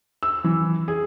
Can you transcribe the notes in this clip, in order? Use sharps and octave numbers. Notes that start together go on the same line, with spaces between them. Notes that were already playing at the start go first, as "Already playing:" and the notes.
E6
E3
G#4